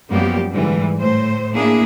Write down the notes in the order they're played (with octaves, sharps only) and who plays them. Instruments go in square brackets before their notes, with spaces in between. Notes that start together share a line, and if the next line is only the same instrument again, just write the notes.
[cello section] F#2 F3 G3 A#3 B3 G4
G#2 D3 E3 G3
A2 C5
A#3 D4 E4 G#4